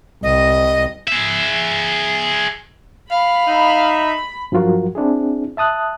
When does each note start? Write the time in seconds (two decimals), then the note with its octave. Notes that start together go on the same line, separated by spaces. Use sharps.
0.23 C2 D#5
1.07 G#4 E5
3.11 F5 B5
3.47 D#4 E5
4.52 G2 F3 F#3 F4 F#4 A#4
4.95 C4 D4 E4 G#4
5.57 E5 A5 D#6 F#6